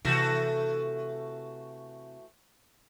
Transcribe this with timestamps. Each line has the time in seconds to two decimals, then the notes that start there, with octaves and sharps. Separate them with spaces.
0.05 C3 E3 A3 F#4